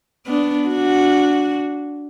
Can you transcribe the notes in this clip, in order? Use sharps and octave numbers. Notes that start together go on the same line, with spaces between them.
B3 D4
D4 F#4